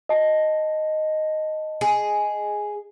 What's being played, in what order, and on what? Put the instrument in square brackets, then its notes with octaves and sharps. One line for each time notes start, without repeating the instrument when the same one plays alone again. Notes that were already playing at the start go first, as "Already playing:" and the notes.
[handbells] D#5 A5
[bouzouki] G#4